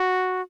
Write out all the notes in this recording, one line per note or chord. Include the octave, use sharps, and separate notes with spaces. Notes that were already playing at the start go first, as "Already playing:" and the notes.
Already playing: F#4